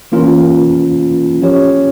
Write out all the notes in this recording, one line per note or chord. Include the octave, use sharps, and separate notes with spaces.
E3 A#3 C#4 F4 A#4
F3 C#4 G4 C#5